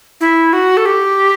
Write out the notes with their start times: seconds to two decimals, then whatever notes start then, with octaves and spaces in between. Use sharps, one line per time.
0.21 E4
0.53 F#4
0.77 A4
0.86 G4